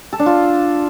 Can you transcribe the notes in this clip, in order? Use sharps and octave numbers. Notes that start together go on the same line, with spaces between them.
A4
D4
F4